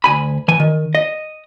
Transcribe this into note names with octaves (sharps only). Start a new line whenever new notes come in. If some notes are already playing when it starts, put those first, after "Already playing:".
D2 G#5 B5
E3 G#5
D#3
D#5